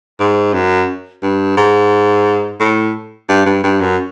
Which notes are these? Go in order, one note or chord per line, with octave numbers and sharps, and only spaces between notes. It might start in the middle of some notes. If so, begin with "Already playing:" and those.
G#2
F#2
G2
G#2
A2
G2
G2
G2
F#2